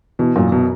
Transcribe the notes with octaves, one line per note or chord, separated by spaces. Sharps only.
B2 E3
F#2 A#2
B2